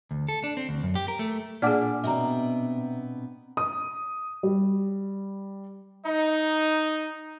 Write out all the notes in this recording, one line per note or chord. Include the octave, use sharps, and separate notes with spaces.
D2
A4
D4
C4
D2
F#2
G4
A#4
A3
A#2 D4 G#4 D5 F#5 G#5 D6 F6
B2 B3 C4 E5 A#5
D#6
G3
D#4